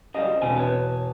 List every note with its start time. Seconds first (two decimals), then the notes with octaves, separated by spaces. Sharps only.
0.14 C#3 F#3 G3 D#5 F5
0.28 F3
0.42 E1 D3 C4 G#5
0.56 B4 C#5